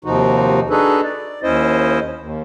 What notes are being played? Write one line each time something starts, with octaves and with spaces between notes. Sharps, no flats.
D#2 C3 F3 D#4 F#4
D4 D#4 F#4 G#4 A4 B4
D5
D#2 C#4 E4 C5 D#5
D#2